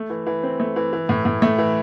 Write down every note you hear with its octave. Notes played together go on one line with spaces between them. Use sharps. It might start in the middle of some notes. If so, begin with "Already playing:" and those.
Already playing: A3
E3
E3
C4
A3
E3
E3
A2
A2
A3
E3